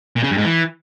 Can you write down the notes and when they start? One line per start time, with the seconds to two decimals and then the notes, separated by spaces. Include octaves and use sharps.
0.16 A#2
0.23 C#3
0.30 G2
0.38 G#2
0.45 E3